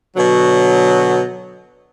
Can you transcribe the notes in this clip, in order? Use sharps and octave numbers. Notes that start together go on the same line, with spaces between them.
B2 D3 F#3